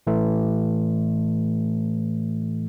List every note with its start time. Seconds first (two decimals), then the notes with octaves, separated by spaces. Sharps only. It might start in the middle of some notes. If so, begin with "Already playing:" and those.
0.07 A2 E3 A3